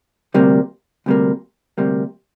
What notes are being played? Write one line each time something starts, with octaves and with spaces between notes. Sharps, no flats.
D2 C3 G3 A#3
D2 C3 G3 A#3
D2 C3 G3 A#3